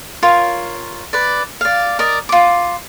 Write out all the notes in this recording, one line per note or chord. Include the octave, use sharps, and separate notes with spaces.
F4 A#4 C#5
B4 D5
D5 F5
A#4 D5 D#5
F4 D6